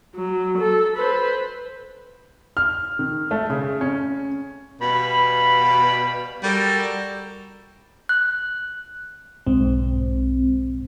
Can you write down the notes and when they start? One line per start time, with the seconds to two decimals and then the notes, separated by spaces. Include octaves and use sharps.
0.15 F#3
0.58 A4
0.97 B4 C5
2.57 F6
2.99 D#3
3.31 A3
3.50 C#3
3.81 C#4
4.81 B2 G3 F5 B5
6.43 G3 F#4 A4 A#4
8.09 F#6
9.47 B1 G#2 C4